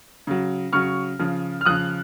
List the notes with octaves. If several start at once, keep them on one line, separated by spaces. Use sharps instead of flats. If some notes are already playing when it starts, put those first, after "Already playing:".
C#3 F#3
C#3 F#3 C#6 F6
C#3 F3
F6
C#3 F3 D#6 F#6